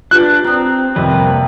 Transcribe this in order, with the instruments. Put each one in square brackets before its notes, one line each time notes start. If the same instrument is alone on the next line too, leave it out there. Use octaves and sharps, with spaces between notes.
[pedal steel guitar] D4 [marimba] F4 G4 B4 [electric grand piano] F#6
[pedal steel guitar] C4 [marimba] A#5 D#6
[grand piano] F2 C3 [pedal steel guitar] G3 A#3 B4